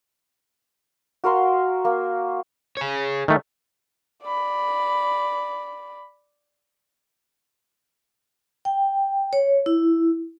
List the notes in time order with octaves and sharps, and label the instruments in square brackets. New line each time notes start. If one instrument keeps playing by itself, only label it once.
[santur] F#4 A#4 F5 C6
A#3
[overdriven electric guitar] G#4 C#5
[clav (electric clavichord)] D#3 A3
[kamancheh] D5 B5
[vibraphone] G5
C#5
E4